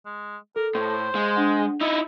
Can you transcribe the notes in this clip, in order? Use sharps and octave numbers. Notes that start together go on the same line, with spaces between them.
G#3
A4 A#4
A2 C5
G#3 F5
D4 F#5
D#4 E4 E6 A6 C#7